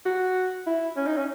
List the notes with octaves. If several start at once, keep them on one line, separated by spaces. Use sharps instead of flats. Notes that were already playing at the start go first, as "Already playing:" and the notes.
F#4
E4
C#4
D#4
C#4